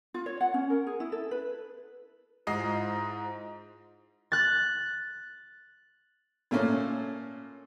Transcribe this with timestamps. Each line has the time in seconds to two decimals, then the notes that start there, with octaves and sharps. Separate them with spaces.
0.14 F4
0.26 C#5
0.41 F#5
0.54 C#4
0.70 A#4
0.87 G#4
1.00 E4
1.12 A4
1.31 B4
2.47 G#2 E4 F4 C5 D#5 C7
4.32 F#6 A6
6.51 A#2 A3 A#3 C#4